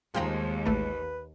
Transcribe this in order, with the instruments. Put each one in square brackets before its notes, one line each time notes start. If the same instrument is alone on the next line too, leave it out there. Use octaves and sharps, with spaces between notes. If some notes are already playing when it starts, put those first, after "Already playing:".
[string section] D#2 [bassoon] F3 [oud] G#3 F4 [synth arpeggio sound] F5 G5 A#5
[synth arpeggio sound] A1 A3 A5 [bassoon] B4